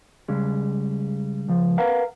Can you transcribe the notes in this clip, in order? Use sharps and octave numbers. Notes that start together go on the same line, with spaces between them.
C#3 G3 G#3
C#2 F3
A#4 B4 F5 F#5 A#5